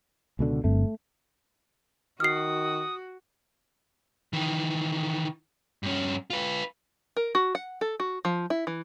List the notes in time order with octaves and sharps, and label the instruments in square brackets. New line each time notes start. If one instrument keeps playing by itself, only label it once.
[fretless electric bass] C#2 B2 D3
[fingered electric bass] G1 G2 C4 [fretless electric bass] A3
[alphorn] D#3 [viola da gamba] F#4 [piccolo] D#6 [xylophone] F6 C7
[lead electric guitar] D#3 E3
G2 C#4
F4 B4
[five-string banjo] A#4
F#4
F#5
A4
F#4
F3
E4
E3